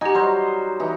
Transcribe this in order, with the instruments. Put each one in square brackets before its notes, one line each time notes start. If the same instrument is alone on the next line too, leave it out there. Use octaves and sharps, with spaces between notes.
[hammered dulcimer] D#4 F#4 G#5 [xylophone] G4 D#5
[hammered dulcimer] F#3 G3 C5
E3 D#4